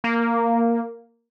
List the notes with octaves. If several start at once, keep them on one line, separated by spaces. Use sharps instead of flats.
A#3